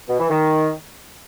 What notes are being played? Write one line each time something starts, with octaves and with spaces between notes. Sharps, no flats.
B2
E3
D#3